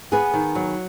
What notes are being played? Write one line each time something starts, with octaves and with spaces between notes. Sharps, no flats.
B3 G#4 B4
D#3
F#3